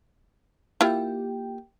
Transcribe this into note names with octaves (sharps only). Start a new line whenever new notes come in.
A#3 E4 F4 G4 G5